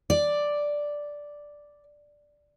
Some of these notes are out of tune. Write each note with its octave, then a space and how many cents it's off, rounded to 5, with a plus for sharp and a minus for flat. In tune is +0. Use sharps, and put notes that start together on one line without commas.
D5 +0